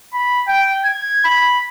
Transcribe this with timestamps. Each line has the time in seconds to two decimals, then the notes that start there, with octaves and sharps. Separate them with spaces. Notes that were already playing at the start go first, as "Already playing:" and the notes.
0.13 B5
0.47 G5
0.85 G#6
1.24 B5